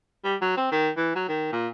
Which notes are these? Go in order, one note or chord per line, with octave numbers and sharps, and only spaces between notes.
G3
F#3
C4
D#3
E3
F#3
D#3
A#2